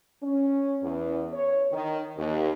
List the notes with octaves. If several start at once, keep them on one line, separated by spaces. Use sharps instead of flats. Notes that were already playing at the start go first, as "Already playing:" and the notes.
C#4
E2
C#5
D#3
D#2